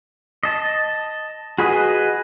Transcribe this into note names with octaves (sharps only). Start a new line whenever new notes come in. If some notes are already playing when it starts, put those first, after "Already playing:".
D#5 A5
F#4 G#4 B4 D#5